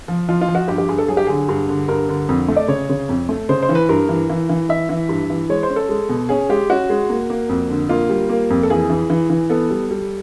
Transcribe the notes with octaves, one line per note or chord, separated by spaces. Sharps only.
F3
F3 F4
F4
F3
F#4
G2 G4
G4
G2 G#4
A4
F#3 G#4
G4
D3 G#4
G2
D3
G2 A#4
D3
F2
A3
D5
C#3 C#5
C#3
F2
A3
C#3 C5
C5
E3
B4
G2 A#4
E3
E3
E3
E3 E5
E3
G2
E3
G#3 C#5
C5
C#4
A4
G#3
B2
C#4 G#4
G#3 G4
C#4 F#4
G#3
A#3
A#3
F2
D3
A#3 F4
G3
A#3
F2
A4
E3 G#4
E3
E3
E3
B3 A4
G3
G3